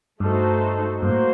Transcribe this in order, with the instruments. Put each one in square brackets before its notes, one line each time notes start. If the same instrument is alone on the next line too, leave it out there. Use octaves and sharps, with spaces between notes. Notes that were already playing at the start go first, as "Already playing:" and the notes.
[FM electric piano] G2 [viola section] A3 D#4 F#4 A4 C5
[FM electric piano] G2 [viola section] A#3 F#4 C5
[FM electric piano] A2